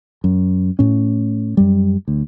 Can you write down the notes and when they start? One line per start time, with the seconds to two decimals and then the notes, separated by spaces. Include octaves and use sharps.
0.24 F#2
0.79 A2 C#4
1.57 F#2 G3
2.08 D2